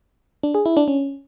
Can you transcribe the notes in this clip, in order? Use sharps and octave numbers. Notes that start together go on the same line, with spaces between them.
D4
G#4
E4
D4
C#4